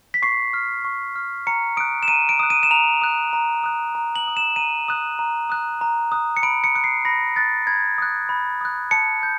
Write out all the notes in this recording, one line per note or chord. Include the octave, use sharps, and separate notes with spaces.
B6
C#6 C7
F6
C#6
F6
A#5 C#7
D#6 F#6 D7
E7
A#5 D#7
D7
D#6 F#6
D#7
E7
A#5 F7
D#6 F#6
A#5
D#6 F#6
A#5
F#7
D#6 F#6
E7
A#5 D#7
D#6 F#6
A#5
D#6 F#6
A#5
D#6 F#6
C#7
B5 D7
C#7
D#6 F#6 C#7
C7
B5 A#6
D#6 F#6 A6
B5 G#6
D#6 F#6
B5
D#6 F#6
A5 C#7
G6